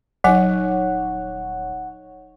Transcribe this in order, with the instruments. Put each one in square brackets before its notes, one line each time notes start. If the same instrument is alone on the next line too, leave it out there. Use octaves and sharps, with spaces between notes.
[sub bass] D#1 [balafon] F#3 G#5 [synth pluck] D#4 C#5 [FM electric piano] F#5